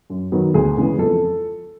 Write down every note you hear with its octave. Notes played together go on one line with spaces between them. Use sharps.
F#2
D#3 F#3 B3
D2 G#4
C#3 E3 G#3 B3
F2 A4